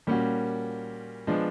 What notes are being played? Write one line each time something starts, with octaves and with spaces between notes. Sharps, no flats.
A#2 G3 A#3 C#4 F#4
F3 G#3 B3 D4